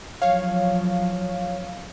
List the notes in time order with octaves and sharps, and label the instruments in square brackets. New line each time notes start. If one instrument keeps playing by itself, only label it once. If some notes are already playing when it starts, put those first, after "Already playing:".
[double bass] F3 F#3 [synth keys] C#5 F5